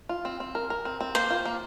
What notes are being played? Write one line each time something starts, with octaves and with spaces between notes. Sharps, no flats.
F4
C4
C4
A#4
A#4
C4
C4
A#3 C5
F4
A#3